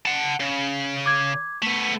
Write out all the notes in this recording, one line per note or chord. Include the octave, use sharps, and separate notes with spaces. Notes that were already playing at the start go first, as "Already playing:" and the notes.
F#5 A5
C#3
D6 G#6
A3 B3 B6